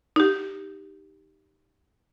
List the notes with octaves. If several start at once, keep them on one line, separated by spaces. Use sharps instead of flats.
D#4 G4